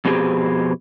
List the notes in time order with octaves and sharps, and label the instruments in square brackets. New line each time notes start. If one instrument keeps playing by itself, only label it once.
[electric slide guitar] F2 B2 F#3 C4 G4 G#4